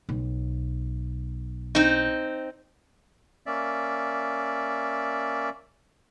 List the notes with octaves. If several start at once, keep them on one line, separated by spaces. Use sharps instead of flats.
B1
C4 D#4
A#3 C#4 D5 E5